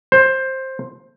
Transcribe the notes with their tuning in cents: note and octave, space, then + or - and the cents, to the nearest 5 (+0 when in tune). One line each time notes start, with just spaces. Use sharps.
C5 +15